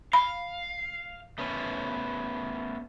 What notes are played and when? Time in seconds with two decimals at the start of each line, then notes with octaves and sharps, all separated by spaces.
0.13 F5 B5
1.38 A3 B3 C#4